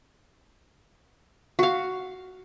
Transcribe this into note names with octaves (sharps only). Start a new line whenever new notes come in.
F#4 F5